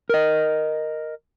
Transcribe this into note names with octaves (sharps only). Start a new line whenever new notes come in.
A#4 D#5